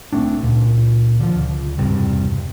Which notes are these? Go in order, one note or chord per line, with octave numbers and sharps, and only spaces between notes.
B1 A3 C4 D4
C#2 A#2
D3 F3
C#2
E1 C#2 G2 C3